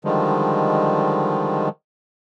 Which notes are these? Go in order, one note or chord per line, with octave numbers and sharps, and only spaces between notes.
D3 D#3 F3 G3 G#3